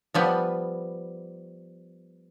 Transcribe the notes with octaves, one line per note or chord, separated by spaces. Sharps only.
F3 G3 B3